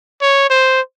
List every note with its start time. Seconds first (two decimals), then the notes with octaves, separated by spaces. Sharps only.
0.22 C#5
0.50 C5